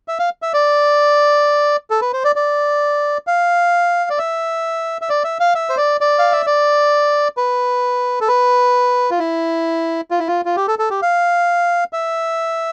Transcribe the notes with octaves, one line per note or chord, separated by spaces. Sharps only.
E5
F5
E5
D5
A4
B4
C5
D5
D5
F5
D5
E5
E5
D5
E5
F5
E5
C5
D5
D5
F5
E5
D5
B4
A4
B4
F4
E4
F4
E4
F4
F4
G4
A4
A4
G4
F5
E5